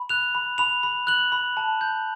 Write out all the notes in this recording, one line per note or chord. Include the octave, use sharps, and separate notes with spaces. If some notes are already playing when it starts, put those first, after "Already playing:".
Already playing: B5
F#6 F7
B5
B5 F7
B5
F#6 F#7
B5
A5
G6